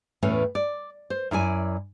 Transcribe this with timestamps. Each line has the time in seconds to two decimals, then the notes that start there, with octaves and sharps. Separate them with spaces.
0.22 E2 A2 E3 A3 C#4
0.55 D5
1.10 C5
1.31 F#2 E4 D5 G#5